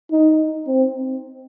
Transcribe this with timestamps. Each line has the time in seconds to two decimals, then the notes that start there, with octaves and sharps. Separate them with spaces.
0.11 D#4
0.67 C4